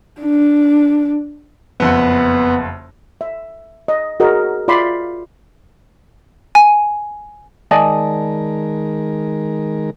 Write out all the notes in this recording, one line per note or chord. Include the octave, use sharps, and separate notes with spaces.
D4
F#1 F2 B3 F#5
E5
D#5
F#4 G#4 A#4 D#5
F4 D5 E5 B5 C6
G#5
D#3 G#3 A#4 D5 D#5 G#5 A5